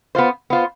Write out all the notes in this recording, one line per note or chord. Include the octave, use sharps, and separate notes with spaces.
B3 F4 C5
B3 F4 C5